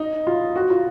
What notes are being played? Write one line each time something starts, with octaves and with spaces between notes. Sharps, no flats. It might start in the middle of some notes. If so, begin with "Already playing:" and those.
Already playing: D#4
F4
F#4
F4